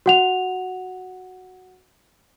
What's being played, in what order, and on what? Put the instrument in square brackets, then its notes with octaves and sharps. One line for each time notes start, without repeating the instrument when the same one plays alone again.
[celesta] F#4 F#5 F7